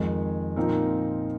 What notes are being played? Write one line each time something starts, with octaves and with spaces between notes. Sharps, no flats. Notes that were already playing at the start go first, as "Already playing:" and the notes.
Already playing: F2 D#3 G#3
A#2 F3 C4 D#4 A#4